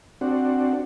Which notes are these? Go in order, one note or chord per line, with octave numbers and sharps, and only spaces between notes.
C4 D4 F#4